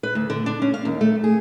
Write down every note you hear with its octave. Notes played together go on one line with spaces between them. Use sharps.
B4
D2
D3
D4
C#4
F5
D#2
A3
G#4